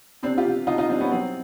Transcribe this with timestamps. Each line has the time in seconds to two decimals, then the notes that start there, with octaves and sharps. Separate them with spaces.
0.23 C3 C4 D4
0.38 F4 G4
0.45 C3
0.67 B2 D#4 F4
0.78 D#4 F4
0.89 G3 C4 D4
1.00 B3 C#4
1.11 F#3 C4